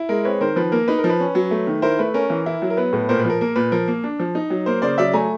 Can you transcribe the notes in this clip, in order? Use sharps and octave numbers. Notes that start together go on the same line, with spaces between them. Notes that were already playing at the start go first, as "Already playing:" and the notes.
Already playing: E4
G#3 A#4
C4 B4 C#5
D#3 A#4 C5
F3 B4
A#3 A#4
D#4 B4
A#4
F3
B4
C#4
F#3
A3
D#3
E4 A#4 C5
A3 B4
C#4 A#4
E3
E4
F#3
A#4
B3 B4
A2
A#2 A#4 C5
B4
F3 A#4
A#3 A#4
A#2 B4
F3 A#4
A#3
D4
F3
D#4
F#3
A#3 A#4 C5
C#3 C5 D5
F#3 D5 E5
A3 G#5 A#5